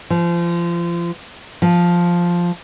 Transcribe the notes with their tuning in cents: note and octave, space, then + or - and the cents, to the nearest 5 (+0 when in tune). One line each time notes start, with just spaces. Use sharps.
F3 -30
F3 +0